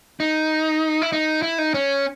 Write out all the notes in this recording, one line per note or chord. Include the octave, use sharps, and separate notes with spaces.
D#4
E4
D#4
E4
D#4
C#4